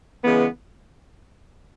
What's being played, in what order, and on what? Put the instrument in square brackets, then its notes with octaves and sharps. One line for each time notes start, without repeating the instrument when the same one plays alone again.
[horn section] C#3 E3 G#3 B3